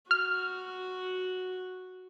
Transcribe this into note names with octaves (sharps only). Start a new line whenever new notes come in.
F#4 F6